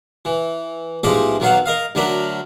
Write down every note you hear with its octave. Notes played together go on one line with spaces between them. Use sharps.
E3
B1 A2 F3 G#3 G4 D#5
B1 D#3 F#3 B3 F5 F#5
A#4 D#5 F5
D2 F#3 D4 A#4 B5